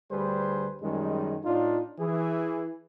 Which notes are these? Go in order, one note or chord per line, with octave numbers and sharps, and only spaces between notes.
D2 D3 G3 G#4 B4 C5
F#2 D#3 G3 G#3
A2 D4 D#4 F4
E3 G#4